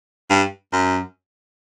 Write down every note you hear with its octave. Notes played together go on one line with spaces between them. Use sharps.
G2
F#2